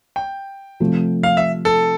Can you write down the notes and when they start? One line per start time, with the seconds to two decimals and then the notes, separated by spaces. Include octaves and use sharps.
0.16 G5
0.80 C3 F3 A3
1.23 F5
1.37 E5
1.65 A4